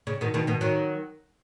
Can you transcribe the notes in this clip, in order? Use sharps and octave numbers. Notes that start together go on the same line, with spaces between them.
C#3
B2 D#3
B2 D#3
B2 D#3
D#3 F#3